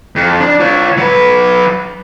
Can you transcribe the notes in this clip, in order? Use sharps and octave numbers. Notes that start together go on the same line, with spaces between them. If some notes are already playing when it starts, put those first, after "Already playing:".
F2
D4
F4 C#5
F#3 B4